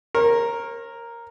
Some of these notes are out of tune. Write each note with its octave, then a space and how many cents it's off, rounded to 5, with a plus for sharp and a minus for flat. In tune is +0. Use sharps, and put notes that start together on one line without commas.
A#4 +0 C#5 -40